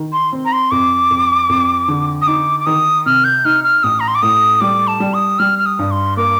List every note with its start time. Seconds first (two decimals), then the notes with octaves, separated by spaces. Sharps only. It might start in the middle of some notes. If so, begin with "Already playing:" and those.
Already playing: D#3
0.13 C6
0.33 C4
0.45 A#5
0.53 C6
0.71 F2 D6
1.11 F2
1.49 F2
1.88 D3
2.22 D#6
2.27 D#4 D6
2.60 D6
2.66 D#3 D#6
3.06 C3 F6
3.24 G6
3.45 D#4 F6
3.64 F6
3.83 A1 D#6
4.00 A#5
4.08 C6
4.15 D6
4.22 A2 D#6
4.61 G3 D6
4.87 A5
5.00 G3
5.14 D#6
5.39 G3 F6
5.59 F6
5.66 D#6
5.79 G2
5.91 C6
6.17 A#3 D6